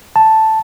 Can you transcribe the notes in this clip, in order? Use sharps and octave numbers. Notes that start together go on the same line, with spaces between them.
A5